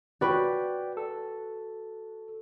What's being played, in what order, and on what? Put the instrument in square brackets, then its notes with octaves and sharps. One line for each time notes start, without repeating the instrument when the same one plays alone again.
[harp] F#4 B4 [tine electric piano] D5 G5
[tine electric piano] A4